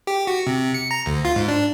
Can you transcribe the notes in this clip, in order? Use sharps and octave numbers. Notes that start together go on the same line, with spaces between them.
G4
F#4
C3
C#7
A#5
D2
F4
G#2
D4